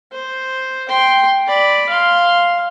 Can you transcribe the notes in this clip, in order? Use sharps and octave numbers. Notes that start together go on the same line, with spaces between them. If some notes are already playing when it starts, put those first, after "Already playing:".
C5
G5 C6
D5 B5
F5 C6